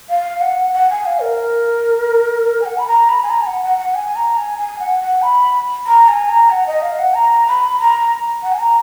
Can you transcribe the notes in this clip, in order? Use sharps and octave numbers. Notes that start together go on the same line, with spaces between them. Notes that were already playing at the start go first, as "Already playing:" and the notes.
F5
F#5
F#5
G#5
F5
A#4
G#5
F#5
B5
A#5
B5
G#5
A#5
G#5
F#5
F#5
F#5
G#5
A#5
G#5
G#5
F#5
F#5
B5
A#5
G#5
A#5
F#5
D#5
F5
F#5
A#5
B5
A#5
F#5
G#5
A#5